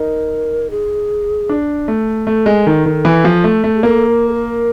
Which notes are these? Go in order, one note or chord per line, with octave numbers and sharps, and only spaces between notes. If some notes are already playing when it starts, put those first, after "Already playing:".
Already playing: D#4 A#4
G#4
D4
A3
A3 A4
G#3
D#3
D#3
E3
F3
A3
A3
G#4
A#3 A4
A#4
A4
A#4